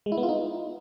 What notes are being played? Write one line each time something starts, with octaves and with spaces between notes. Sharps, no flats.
G#3
E4
B3
F4
D#4